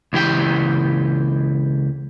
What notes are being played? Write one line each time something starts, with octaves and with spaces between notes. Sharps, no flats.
C#2 E3 G4 G5